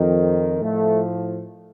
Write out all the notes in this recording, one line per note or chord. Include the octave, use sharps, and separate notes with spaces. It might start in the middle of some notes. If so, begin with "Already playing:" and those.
Already playing: F2 D#3
A2 F3 A3